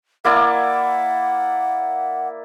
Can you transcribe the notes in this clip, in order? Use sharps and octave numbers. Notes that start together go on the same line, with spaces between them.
A#3 E4 D5 F#5